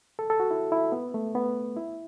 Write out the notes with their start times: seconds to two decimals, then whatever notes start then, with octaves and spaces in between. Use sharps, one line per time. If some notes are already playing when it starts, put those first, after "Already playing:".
0.19 A4
0.30 A4
0.40 F#4
0.51 E4
0.72 E4
0.92 B3
1.14 A3
1.35 B3
1.76 E4